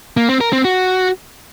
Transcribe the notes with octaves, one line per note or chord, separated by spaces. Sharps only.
A#3
C4
A#4
C4
F#4